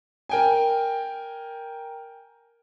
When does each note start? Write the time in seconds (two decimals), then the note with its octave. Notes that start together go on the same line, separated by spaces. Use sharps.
0.29 A#4 G5 G#5